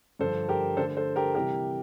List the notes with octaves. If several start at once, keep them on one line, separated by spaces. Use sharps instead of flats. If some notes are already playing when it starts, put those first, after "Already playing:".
G2 D3 F3 A4 C5
G4 A#4
D3 A3 D4 A4 C5
A4 C5
G4 A#4
C3 E3 G3 G4 A#4